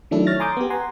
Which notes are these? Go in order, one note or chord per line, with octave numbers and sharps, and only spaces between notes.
D#3 F#3 A3 D4 E4 A4
C#5 F6 A6 A#6
G#5 A#5 C6 D6 D#6 G6
B3 G4
F#5 G#5 A#5 C6